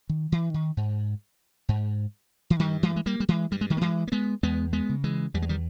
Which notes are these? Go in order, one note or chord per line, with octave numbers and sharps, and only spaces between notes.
D#3
E3
D#3
G#2
G#2
E3
G2 D#3 G3
E3 G#3
G#3
G3 A#3
G3
E3 G#3
G2 G3
G#3
D#3 G3
A#3
E3 G#3
A#3
G#3 B3
E2 G#3 B3
G#3 B3
C#3
E3 G#3
E2 G3
G#3
D#3 G3